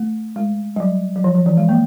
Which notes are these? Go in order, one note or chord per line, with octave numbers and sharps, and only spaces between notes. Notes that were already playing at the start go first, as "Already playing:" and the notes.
Already playing: A3
G#3
G3
F#3
F#3
F3
F3
E3
G#3
A#3